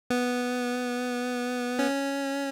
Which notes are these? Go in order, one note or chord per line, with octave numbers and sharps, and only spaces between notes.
B3
C#4